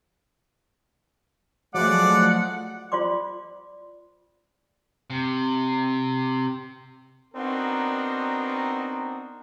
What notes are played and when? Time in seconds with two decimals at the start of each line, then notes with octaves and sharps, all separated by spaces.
1.75 F3 F#3 G#3 A3 D5 F#5 D6
2.92 F4 C5 D5 C6 D6
5.10 C3
7.35 B3 C4 D4 D#4 F#4 A#4